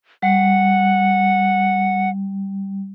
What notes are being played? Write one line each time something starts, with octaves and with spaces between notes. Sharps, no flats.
G3 F#5